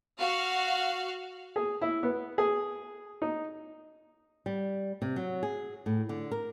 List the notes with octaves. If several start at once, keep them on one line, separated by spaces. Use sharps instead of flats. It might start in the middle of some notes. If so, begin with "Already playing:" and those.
F#4 F5
G#4
E4
B3
G#4
D#4
G3
C3
F#3
G#4
A2
D3
A#4